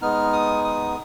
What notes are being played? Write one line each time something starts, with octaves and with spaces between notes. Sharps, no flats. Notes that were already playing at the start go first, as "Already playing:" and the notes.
G#3 B3 D#4 F6
D#6
D#6